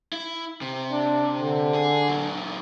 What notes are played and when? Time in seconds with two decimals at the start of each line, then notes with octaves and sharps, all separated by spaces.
0.13 E4
0.61 C3
0.92 D4
1.39 D3
1.74 G#4
2.09 A#2 F#3